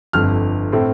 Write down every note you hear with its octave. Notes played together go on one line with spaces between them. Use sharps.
G1 F2 D3 F6
A2 A3 C4